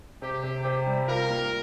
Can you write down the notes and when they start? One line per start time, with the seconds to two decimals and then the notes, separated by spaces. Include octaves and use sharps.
0.22 C3 G4
0.43 C3
0.65 C3
0.86 G3
1.08 F4 A#4
1.30 A#3